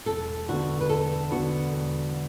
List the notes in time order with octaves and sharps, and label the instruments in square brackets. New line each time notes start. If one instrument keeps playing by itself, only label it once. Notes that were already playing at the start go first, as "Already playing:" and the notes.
[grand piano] E1 [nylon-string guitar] A4
[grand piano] D2 D3 B3 [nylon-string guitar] F#4
[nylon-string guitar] B4
[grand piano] E1 [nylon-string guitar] A4
[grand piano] D2 D3 B3 [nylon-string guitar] F#4
[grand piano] E1